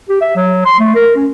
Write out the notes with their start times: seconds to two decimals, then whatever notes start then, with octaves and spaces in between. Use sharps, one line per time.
0.09 G4
0.21 E5
0.36 F#3
0.65 C6
0.80 A3
0.95 A#4
1.16 C#4